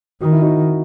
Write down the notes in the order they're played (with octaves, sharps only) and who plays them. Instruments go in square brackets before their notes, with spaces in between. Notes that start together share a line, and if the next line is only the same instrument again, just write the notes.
[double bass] D#3 [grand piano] F#4
[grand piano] E4
D#4 F#4